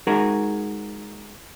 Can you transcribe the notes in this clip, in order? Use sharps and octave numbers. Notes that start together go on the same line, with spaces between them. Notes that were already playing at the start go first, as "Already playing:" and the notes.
G#3 D#4 F#4 G#4 A#4